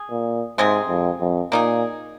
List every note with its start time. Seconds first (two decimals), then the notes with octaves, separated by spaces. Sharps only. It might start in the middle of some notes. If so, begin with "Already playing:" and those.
Already playing: G#4
0.11 A#2
0.58 G#2 C3 G#3 C4 G#4
0.89 F2
1.20 F2
1.52 A#2 A#3 D#4 G#4